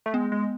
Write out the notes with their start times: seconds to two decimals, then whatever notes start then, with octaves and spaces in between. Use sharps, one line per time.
0.06 A3
0.14 G#3 B3
0.32 G#3